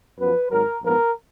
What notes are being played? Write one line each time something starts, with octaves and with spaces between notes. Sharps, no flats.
F#2 F3 B3 B4
G#1 G#2 F#3 A#4
A#1 G#2 F3 B3 A#4